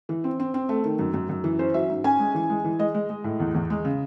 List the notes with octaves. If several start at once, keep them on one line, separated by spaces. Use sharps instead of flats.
E3
C4
C4
C4
A3
D#3
F#2
F#2
F#2
E3
C#4 C5
F#3 E5
G#2
C#4 G#5
G#3
E3
G#3
E3
G#3 D#5
G#3
G#3
A2
E2
E2
G#3
C#3